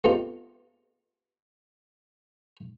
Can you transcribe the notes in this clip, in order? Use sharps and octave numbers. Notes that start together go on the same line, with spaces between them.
A3 B3 C4 D#4 F4 G4